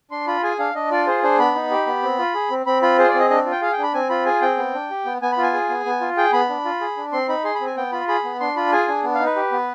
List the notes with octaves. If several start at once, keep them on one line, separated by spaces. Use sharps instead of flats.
D4 C6
F4 B5
G#4 G#5
D4 F5
D4 D#5
F4 D5
G#4 C5
D4 C5
B3 B5
D#4
G4
B3
C4
F4
G#4
C4
C4 B5
F4 B5
G#4 C5
D5
C4
D#5
D4 D#5
F4
G5
G#4 F5
G5
D4 B5
C4 G#5
F4 B5
G#4 G#5
C4 G5
B3
D4
G4
B3
B3 G#5
B5
F4 G#5
G#4
B3
B3
F4
G#4 G5
B3 B5
D4
F4
G#4
D4
C4 C6
D#4 B5
G#4 C6
B5
C4
G#5
B3 G5
F4 B5
G#4 B5
B3
D4 C6
F4 B5
G#4 G#5
D4
B3
F5
D#4
B4
G4
B3